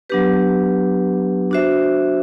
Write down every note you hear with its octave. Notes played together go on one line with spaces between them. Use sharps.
F#3 B3 D4 G4 B4
D4 F#4 C5 E5